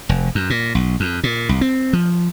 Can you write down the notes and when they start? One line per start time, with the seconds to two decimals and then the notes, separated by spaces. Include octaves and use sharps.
0.09 F1
0.35 F#2
0.50 A#2
0.75 B1
1.00 F2
1.24 A#2
1.49 C2
1.61 C4
1.93 F3